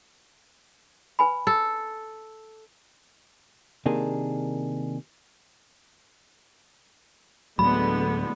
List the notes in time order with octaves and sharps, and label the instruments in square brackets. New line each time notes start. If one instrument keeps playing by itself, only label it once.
[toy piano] B4 G#5 B5
[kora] A4
[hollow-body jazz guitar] C3 D#3 A#3 D4 G#4
[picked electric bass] D2 A2 F#3 [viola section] D3 G#3 B3 [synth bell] B5